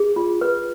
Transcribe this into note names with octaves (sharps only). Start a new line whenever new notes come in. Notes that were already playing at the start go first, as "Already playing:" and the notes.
Already playing: G#4
F4
B4